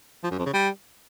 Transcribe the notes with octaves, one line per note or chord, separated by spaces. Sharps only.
F3
F#2
F2
C#3
G3